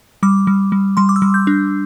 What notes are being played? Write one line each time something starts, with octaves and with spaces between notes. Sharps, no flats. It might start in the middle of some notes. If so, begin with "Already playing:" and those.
G3 D6
G3
G3
G3 C6
D6
E6
G3
G6
D4